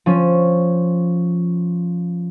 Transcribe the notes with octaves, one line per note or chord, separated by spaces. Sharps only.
F3 C#4